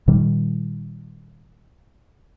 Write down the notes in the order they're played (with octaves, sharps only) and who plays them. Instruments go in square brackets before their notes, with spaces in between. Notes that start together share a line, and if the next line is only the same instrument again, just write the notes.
[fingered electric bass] A#2 D#3 G3